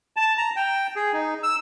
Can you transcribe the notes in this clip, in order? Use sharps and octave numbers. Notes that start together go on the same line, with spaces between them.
A5
A#5
G5
G#4
D#4
E6